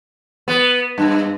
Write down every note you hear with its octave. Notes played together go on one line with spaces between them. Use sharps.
B3
G2